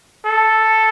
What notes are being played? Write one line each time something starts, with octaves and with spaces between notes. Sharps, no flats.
A4